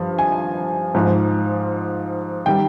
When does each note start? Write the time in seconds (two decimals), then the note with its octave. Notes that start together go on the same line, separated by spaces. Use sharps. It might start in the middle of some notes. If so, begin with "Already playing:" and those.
Already playing: G2 F3
0.19 G#5
0.94 G#2 F3
2.46 D#3 G3 G5